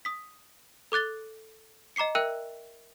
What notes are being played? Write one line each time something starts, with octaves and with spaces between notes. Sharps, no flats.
D#6 B6
A4 D6 F#6 A6 G7
D#5 A#5 D6 C7 C#7
A#4 E5 G5 E6 F#6 D#7